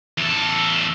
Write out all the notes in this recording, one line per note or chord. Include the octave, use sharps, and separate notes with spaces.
E2 A4